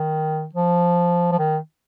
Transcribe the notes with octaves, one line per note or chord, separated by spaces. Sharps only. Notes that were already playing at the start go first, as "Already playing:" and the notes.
Already playing: D#3
F3
F3
D#3